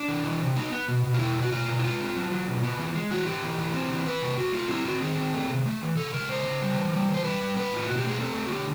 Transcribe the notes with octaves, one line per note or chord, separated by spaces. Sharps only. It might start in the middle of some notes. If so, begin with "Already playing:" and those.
Already playing: D4
E3
E3
C3
B3 D#4
B3
B2
B2
F4
B2 E4
B2
F#4
B2 F4
B2
E4
G#3 F4
C4
F#3
F#3
B2
B3
E3
G#3
E3 F#4
B3 G4
E3
E3
C4
E3
E3 B4
C3
A3 F#4
A3 F4
C4 E4
C4 F#4
D#3 G#4
C4
A3
C3
A3
E3
C#3 A4
G#3 A#4
C#3 C5
C#3
G3
E3
G3
E3
C5
G3 B4
G3
B3 B4
A2 F4
B2 F#4
G4
A3 G#4
C4 A4
A3
F#4
D3 G4